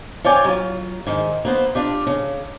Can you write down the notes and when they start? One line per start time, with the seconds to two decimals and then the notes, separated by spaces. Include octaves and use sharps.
0.24 F4 C#5 D5 G5 G#5
0.45 F#3 F4
1.07 G#2 D#3
1.45 A#3 B3 C5
1.75 D4 F4 G4
2.07 C#3